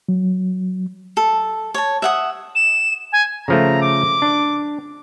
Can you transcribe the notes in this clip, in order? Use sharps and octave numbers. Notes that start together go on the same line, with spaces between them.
F#3
A4
C#5 A5
E5 F#5 D#6
E7
G#5
C#3 F3 A3 A#5
D6
D4